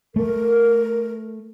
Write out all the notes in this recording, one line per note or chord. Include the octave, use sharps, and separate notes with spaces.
A3 A#4